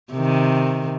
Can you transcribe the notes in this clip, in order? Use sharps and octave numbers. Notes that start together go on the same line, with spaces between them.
C3 D#3